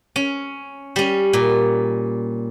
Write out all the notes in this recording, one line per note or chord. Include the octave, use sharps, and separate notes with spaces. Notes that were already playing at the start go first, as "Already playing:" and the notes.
C#4
G3 C#4
A#2